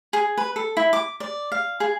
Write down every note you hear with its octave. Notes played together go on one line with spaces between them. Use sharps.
G#4
B4
A4
E4
D6
D5
F5
G#4